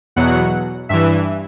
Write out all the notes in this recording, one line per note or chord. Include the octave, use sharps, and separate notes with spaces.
E2 B2 F#3 F#5
G2 E3 E5